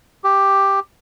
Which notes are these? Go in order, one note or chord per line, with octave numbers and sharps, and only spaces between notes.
G4